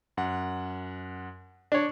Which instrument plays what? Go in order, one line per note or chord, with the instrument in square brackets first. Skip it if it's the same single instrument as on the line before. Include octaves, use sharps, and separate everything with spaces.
[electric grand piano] F#2 F#5
[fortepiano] D4 C#5